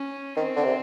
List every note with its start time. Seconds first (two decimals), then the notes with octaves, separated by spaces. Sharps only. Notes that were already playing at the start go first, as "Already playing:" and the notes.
Already playing: C#4
0.37 D#3 C4
0.56 D3
0.65 C3